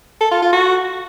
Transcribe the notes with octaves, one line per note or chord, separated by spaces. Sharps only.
A4
F4
F4
F#4